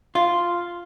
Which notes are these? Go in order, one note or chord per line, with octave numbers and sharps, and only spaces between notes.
F4